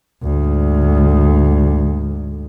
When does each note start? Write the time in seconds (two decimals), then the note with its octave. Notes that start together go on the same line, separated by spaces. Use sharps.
0.23 D2 G#2